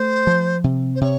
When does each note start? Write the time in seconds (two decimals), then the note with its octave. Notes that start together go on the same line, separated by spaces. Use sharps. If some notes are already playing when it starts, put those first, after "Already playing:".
Already playing: A3 C5
0.27 F3
0.64 C3
0.95 C5
1.01 C3 C#5